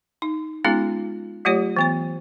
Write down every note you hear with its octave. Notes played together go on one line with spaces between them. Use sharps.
D#4
G#3 B3 C#4 D#4 F4 G#4
F#3 A3 F4 G4 C#5
E3 B3 C5